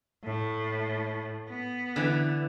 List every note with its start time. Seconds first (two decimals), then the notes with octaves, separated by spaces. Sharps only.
0.24 A2
1.49 B3
1.96 D3 E3